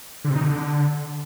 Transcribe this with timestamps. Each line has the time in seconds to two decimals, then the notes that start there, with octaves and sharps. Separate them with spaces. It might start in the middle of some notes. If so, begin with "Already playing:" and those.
0.24 D3
0.30 C3
0.36 D#4
0.41 D3